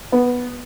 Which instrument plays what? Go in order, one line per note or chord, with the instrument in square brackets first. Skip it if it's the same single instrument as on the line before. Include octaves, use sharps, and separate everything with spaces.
[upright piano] B3